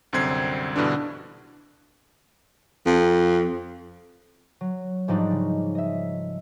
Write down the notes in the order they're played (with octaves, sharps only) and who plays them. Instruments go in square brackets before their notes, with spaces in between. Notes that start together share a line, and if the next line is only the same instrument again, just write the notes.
[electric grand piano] C2 F#2 D3 C4 G#6 C7
G2 B2 D3 E3 D4
[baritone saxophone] F2
[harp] F#3
G#2 F3 G3 D4 D#4 F#4
C#3
D#5 E5